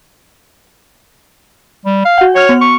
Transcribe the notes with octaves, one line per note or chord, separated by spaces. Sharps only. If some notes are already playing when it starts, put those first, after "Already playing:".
G3
F5
F#4 F#5
C#5 F#5 F6 F7
B3
C#6